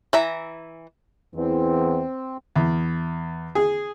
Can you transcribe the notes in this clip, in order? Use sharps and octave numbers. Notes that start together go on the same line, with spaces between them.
E3 E5 A#5
E2 E3 C4
E2
G#4